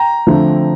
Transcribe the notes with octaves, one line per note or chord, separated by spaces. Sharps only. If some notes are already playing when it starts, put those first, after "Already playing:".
Already playing: G5 A#5
D3 F3 A3 C4